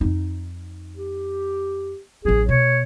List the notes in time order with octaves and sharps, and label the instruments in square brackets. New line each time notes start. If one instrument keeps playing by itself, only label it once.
[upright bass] F2 D#4
[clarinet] G4
[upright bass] A1 F#3 [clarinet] G#4
[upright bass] B2 [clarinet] C#5